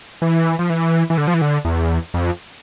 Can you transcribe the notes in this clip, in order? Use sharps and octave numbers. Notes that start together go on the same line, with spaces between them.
E3
F3
E3
E3
D3
F3
E3
D3
E2
F2